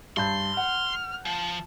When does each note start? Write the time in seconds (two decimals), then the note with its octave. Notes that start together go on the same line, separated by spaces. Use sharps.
0.17 G2 A5 C6 G6
0.57 F#5 F6
1.26 F3 A5